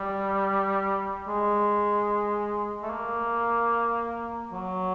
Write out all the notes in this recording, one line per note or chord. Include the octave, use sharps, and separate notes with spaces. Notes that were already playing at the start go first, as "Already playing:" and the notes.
Already playing: G3
G#3
A3
A#3
F#3